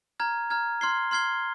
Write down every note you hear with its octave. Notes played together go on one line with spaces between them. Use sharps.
A#5 F6 G#6
A#5 F6 G#6
C6 F6 G#6 C7 G7
C6 F6 G#6 C7 G7